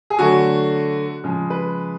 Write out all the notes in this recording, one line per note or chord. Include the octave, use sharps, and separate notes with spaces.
G#4
D3 F#3 A3 F#4
C#3 F3 G#3
B4